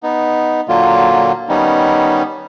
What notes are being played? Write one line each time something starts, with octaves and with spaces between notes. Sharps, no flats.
B3 D#4
A#2 D3 F#3 A#3 F4
D#3 G3 B3 C#4 D#4